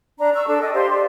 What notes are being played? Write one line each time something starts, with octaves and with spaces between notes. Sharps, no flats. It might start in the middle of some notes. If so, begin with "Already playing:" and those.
D4 A#5
A#5 C#6 E6
D4 A4 A5
D5 D#5 G5 D#6
G4 C5 F5 C6
D5